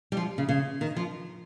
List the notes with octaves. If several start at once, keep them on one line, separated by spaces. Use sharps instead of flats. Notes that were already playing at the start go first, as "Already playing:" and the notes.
G3
F3
C#3
C#3
D#3
F3